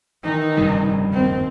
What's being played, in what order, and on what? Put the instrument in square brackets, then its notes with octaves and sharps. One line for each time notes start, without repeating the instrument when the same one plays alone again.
[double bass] D#3 E3 [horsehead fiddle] D#4
[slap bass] F1 G2 C#3 [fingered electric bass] G3
[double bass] D#2 [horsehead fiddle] C4